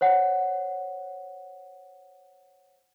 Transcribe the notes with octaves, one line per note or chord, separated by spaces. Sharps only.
C5 C#5 F#5